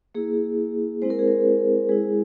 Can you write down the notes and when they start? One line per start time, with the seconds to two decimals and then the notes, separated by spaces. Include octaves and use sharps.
0.15 A#3 E4 G#4
1.02 G#3 C4 E4 C5
1.10 A#4
1.19 G#4
1.28 A#4
1.89 G#3 E4 G#4